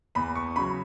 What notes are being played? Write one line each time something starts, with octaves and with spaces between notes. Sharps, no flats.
E2 B5
C#6
C#3 F#3 B5